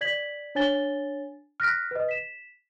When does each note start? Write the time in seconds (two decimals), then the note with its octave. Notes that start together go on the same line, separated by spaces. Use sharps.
0.01 D5 G#6 B6 F#7
0.55 D4 C#5 G#5 A6 G7
1.60 F6 F#6 A#6 B6 D7
1.91 B4 D#5
2.09 B6 E7